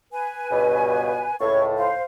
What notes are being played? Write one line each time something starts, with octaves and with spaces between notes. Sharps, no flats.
B4 G#5
C#2 G2 B2
C#2 A2 C#5 C#6
C5 F5